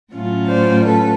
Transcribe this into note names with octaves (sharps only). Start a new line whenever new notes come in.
A2 F#3 A3 C#4 F4
C5 D5
A4 B4